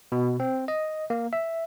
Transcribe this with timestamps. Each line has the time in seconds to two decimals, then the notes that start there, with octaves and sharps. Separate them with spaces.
0.12 B2
0.40 C4
0.68 D#5
1.10 A#3
1.33 E5